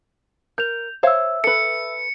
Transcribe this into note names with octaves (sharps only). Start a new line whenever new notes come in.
A#4 G6 F7
C5 C#5 E5 F5 E6
A4 B4 C#7